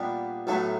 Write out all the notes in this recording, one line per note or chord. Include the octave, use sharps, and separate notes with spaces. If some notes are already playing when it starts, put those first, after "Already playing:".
Already playing: A#2 G3 B3 D4 A#4
B1 A2 F#3 A3 A4